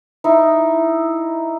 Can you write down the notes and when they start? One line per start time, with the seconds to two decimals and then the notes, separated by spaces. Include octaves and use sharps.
0.24 D#4 E4